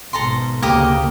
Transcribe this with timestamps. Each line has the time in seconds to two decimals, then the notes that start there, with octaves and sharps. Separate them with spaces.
0.13 G#1 B2 A4 A#5 C6
0.62 D2 C#3 A#3 G4 A#5 D#6